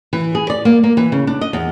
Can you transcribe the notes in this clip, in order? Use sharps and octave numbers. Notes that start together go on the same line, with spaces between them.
E3
G#4
D5
A#3
A#3
E3
C#3
D4
D#5
E2